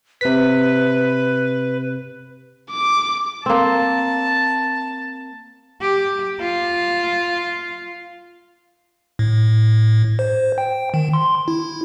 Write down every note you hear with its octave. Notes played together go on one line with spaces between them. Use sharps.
C3 B4 B6
D6
A#3 C4 A5
G4
F4
A2
C5
G5
D#3
C6
E4